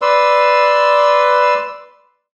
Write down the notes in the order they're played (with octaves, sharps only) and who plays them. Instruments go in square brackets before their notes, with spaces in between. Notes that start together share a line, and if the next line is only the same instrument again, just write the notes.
[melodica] B4 D5 C6 E6